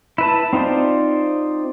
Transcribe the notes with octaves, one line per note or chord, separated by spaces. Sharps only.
E4 B4 A5
C4 D#4 F4 C5 D5